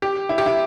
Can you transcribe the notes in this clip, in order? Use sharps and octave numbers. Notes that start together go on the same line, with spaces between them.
G4
E4
G4
E4